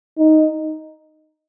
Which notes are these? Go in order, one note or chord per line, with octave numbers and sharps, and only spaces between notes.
D#4